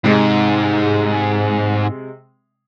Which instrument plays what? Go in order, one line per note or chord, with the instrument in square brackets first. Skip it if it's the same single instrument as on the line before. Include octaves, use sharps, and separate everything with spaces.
[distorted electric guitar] G#2 [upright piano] C3 G#3